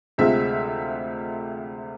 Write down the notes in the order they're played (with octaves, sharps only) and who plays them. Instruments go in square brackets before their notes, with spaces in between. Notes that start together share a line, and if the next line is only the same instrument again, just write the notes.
[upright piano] D2 C3 G#3 C4 F4 E5